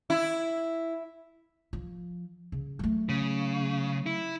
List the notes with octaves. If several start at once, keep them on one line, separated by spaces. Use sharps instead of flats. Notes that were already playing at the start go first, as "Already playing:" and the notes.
E4
F3
C#3
F#3 A3
C#3
E4